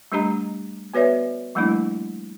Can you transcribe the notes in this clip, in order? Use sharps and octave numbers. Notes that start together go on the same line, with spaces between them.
G3 A3 D4 G4 D#5 A#5
B3 F#4 B4 C#5 D5 E5
F3 G3 A3 A#3 D4 E4